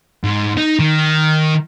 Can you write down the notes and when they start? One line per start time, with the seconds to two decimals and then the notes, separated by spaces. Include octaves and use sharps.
0.24 G#2
0.57 D#4
0.79 D#3